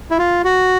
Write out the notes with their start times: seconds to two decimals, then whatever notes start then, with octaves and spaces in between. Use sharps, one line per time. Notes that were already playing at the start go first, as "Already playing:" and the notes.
0.11 E4
0.18 F4
0.44 F#4